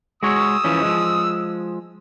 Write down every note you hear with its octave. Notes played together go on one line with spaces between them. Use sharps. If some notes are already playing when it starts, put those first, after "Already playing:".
G#3 F#4 C#5 D#6 E6
E3 F3 C#4
F3 G#3